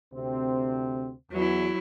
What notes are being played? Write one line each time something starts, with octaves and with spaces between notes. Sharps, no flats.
D2 C3 C4
E2 F#3 E4